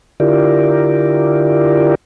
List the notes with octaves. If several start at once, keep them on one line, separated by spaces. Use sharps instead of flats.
D3 E4 F4 G4 A#4 D5